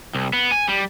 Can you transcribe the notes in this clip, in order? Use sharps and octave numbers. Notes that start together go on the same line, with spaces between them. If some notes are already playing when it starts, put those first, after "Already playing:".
C2
B3
G#5
G3